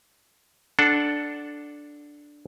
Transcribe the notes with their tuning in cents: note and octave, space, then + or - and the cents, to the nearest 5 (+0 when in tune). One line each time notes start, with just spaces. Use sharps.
D4 +0 A4 -10 F#5 +0